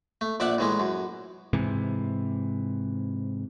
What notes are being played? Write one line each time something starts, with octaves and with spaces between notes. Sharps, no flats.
A3
A#1 D5 E5 F#5 A5
A2 E3 G#3
F#2
G#2 C3 E3